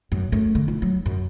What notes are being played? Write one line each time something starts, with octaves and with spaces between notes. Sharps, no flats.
F#2
F#2 A3
D3
F4
F#3
F#2